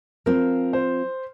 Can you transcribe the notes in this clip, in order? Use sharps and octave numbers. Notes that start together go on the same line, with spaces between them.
F3 C4 F4 A#4
C5